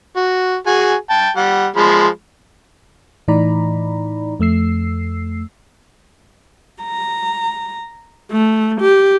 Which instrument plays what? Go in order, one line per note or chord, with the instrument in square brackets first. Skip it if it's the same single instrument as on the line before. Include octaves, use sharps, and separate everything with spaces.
[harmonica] F#4
F#4 G#4 G#5
G5 A5
G3 F#5
F3 G#3 B5
[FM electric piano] A2 E3 D#4 D5 A#5 B5
F2 A3 E6 C7
[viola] A#5
A3
G4